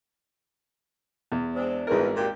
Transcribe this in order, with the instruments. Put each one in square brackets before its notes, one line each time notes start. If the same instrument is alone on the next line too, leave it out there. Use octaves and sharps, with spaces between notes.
[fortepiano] E2
[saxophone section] G#3 C4 D4
[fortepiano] G#1 A#4 [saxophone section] E2
[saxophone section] D#2 A#2 G4